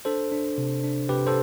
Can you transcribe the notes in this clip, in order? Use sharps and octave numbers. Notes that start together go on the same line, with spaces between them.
D4 A4 C5
D4
C3
D4
C3 G4 B4
A4 C5